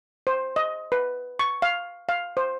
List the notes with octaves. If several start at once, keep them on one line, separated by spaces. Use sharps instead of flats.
C5
D#5
B4
C#6
F5
F5
C5